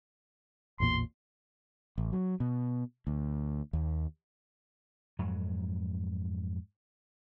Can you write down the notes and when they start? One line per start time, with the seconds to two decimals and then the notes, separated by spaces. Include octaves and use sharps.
0.80 A1 E2 A#2 C6
1.98 A1
2.13 F#3
2.40 B2
3.07 D2
3.73 D#2
5.19 F2 G#2 F#3